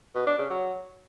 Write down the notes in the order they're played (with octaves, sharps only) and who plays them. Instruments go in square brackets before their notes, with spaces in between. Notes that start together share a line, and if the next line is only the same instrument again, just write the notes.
[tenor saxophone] B2
D4
C#3
F#3